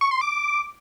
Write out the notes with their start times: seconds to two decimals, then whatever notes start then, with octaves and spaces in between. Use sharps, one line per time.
0.01 C#6
0.11 C6
0.21 D6